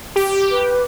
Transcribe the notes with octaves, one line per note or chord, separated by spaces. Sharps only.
G4
B4